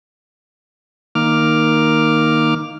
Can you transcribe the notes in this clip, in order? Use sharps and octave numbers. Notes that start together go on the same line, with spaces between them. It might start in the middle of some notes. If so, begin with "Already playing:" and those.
D#3 A#3 D6 F6